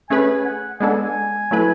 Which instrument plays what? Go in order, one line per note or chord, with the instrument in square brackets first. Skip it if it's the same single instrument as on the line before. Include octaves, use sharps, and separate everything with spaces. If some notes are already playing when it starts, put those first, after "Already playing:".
[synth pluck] A3 C#4 G#4 B4 [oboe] G#5
[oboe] G#5
F#5
[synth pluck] G#3 B3 D4 A4 [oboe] G#5
[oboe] G#5
[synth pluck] F#3 A3 E4 B4